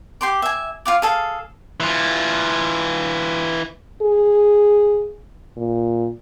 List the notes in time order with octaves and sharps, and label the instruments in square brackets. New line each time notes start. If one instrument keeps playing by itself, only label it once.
[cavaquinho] G4 C6 D6
E5 G#5
F4 F5 D6
G#4 A4 F5
[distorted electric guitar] E3 F4
[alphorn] G#4
A#2